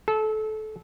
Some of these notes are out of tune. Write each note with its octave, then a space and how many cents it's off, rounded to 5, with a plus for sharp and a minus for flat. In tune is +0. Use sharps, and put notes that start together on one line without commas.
A4 -25